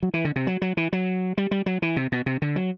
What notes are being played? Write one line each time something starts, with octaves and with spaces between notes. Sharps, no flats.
F#3
E3
D3
C3
F#3
F#3
E3
F#3
G3
G3
F#3
E3
C3
B2
C3
D3
F#3